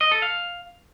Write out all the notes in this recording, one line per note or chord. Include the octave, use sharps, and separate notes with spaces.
D#5
A4
F5